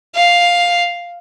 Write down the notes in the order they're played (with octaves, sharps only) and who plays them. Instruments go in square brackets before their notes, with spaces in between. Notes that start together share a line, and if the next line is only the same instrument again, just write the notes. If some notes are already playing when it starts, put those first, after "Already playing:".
[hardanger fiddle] F5